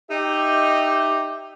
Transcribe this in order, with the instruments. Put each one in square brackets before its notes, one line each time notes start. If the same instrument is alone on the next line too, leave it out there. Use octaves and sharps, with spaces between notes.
[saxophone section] D#4 E5 [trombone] G4